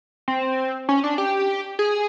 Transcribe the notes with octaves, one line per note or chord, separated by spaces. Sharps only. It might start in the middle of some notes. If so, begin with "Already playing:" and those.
C4
C#4
D4
G4
G#4